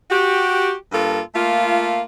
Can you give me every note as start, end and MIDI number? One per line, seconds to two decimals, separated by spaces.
0.11 0.74 66
0.11 0.74 67
0.92 1.20 43
0.92 1.20 58
0.92 1.20 65
0.92 1.20 69
1.35 2.02 57
1.35 2.02 58
1.35 2.02 65